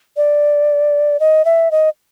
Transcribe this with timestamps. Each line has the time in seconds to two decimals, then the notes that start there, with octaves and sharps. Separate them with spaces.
0.17 D5
1.20 D#5
1.45 E5
1.71 D#5